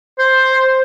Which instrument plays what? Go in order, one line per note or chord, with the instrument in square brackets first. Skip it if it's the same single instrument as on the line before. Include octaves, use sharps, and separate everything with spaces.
[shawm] C5